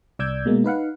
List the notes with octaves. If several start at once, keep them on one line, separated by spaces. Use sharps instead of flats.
C2 D5 D6 E6 G6 G#6
B2 G#3 A#3
D#4 B4 F5 F#5